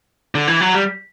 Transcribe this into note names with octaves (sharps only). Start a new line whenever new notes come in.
D3
E3
F#3
G3